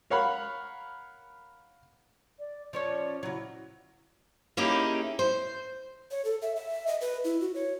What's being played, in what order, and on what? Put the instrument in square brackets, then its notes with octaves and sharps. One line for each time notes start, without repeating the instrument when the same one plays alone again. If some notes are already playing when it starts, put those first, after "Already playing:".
[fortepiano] A#4 C#5 F5 F#5 B5
[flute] D5
[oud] F3 C#4 C#5 [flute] D5
[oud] C#3 F#3 [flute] E4
[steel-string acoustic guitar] A#3 C#4 D#4 E4 G4 G#4
C5
[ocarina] C#5
A4
E5
E5
D#5
B4
E4
F#4
C#5